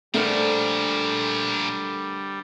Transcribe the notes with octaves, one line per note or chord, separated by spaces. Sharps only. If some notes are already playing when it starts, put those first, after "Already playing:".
A#2 D3 F3 G3 A3 A#4 C5